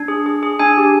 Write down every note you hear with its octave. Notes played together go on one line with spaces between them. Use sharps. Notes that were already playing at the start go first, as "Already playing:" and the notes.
Already playing: D4
G#4
G#4
G#4
D4 G#5
G4